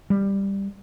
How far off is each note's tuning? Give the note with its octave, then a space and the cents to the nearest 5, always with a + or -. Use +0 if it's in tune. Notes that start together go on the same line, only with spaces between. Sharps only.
G3 +10